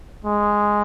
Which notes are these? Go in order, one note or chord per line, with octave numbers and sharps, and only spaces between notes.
G#3